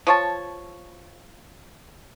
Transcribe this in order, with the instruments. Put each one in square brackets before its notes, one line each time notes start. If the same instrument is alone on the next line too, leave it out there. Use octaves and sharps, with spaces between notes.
[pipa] F3 C#5 A5